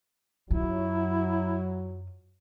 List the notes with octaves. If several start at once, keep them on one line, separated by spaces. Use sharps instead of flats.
F#2 F#3 E4 F4